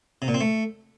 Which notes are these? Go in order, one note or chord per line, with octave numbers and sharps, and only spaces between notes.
C3
A#2
C4
A3